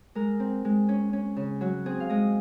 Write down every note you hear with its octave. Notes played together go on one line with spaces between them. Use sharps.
G#3 A#4
C4
G#3
C#4
C#4
C#3
F#3 F#4
C4 G#4
F5
G#3 D#5